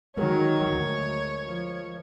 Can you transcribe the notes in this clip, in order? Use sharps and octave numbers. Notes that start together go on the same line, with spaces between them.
D#3 F#3 G#3 G#4 A#4 C#5
D2
F3